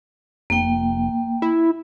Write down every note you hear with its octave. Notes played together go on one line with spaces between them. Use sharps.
F1 A#3 G5
E4